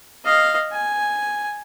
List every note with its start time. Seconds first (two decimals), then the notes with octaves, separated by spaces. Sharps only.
0.25 D#5 F5
0.72 G#5